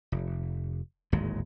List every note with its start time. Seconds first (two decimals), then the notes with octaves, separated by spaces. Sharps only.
0.12 F1
1.12 D1 G#1 D#2 G#3